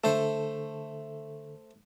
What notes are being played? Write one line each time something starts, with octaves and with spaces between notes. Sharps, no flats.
D3 A3 A4 C5